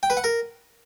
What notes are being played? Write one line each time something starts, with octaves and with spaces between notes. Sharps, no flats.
G5
B4
F#5
A#4